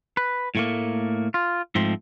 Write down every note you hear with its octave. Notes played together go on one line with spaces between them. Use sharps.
B4
A2 A3 A#3
F4
G#2 F3 A3 C4